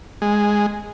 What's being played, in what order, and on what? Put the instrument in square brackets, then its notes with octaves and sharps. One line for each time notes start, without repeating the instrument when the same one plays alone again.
[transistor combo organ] G#3